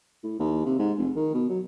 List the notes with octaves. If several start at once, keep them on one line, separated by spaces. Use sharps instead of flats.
A2
D#2
C3
G#2
F1
D#3
B2
F#3